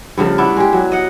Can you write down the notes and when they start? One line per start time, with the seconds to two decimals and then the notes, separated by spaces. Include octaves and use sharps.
0.18 G2 C#3 F3 A3
0.38 B3 D4 E4
0.57 G#3 G4
0.73 F#3
0.92 D#5 F#5